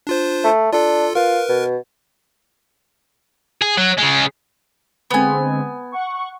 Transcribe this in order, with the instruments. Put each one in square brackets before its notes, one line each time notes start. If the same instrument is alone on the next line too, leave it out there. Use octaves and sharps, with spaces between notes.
[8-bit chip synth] D4 F4 C5
[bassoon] A3
[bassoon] D4 [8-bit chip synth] F4 A4
[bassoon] F4 [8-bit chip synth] A#4 B4
[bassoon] B2
[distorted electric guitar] G#4
F#3
C#3 G#3
[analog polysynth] D3 G#3 C4 [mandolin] B3 G#5
[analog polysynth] F#5 C#6